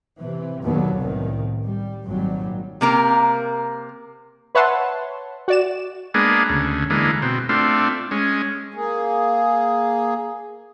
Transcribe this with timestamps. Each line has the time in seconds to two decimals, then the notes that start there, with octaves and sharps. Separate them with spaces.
0.20 C3 E3
0.64 D#2 B2 D3 F#3 B3
0.96 C2 A2 D#3
1.65 G3
2.06 G#1 A#2 F#3 G3
2.81 C3 A#3 A#4
4.55 B4 C#5 E5 F#5 A5 C6
5.48 F#4 D5 E7
6.14 G#3 A#3 B3 D4 G#4
6.49 D2 C#3
6.90 D3 E3 G#3 A#3
7.22 B2 C4
7.49 A3 C4 D4 F4
8.11 G#3 C#4
8.74 A#3 G#4